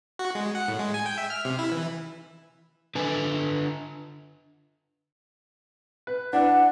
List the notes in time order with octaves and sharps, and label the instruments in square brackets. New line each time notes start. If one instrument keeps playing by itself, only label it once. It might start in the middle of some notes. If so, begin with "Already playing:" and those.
[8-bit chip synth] F#4
G#3
F#5
A2
G#3
G#5
G5
E5
F6
C3
E4
E3
[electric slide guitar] D3 B4 G#5
[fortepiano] B4
[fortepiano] D4 E4 B4 [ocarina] F#5